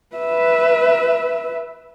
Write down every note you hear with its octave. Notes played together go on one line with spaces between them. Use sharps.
B4 E5